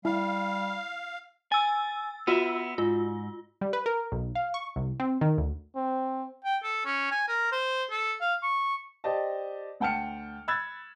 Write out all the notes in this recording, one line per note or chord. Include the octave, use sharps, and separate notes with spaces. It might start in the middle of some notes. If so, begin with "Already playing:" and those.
G3 E4 F5
G#5 E6 A6
B3 F4 F#4 B4 E5 E6
G#2 F4
G3
B4
A#4
B1
F5
C#6
C2
C4
D#3
D2
C4
G5
A4
C#4
G#5
A#4
C5
A4
F5
C#6
G4 C5 D5 D#5 A5
D2 F#5 G5 A5 F6 C#7
B5 E6 F#6 G#6 A6